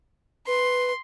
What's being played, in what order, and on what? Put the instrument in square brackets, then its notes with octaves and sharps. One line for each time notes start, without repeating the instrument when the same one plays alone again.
[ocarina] B4 [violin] C6